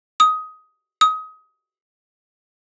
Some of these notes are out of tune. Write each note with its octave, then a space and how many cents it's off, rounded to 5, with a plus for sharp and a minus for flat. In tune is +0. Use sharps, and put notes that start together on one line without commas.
D#6 +15
D#6 +25